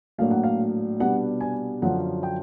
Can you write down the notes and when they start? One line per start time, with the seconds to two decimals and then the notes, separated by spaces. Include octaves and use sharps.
0.18 A#1 A2 F#3 A#3 D4 F5
0.31 F#5
0.44 F5
1.00 C2 B2 G3 B3 D4 F#5
1.41 G#5
1.82 F#2 D3 F3 F#5
2.23 G5